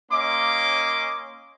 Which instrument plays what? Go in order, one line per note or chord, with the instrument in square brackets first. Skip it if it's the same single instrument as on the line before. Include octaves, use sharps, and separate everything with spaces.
[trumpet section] A#3 C#4 D#5 C6 D6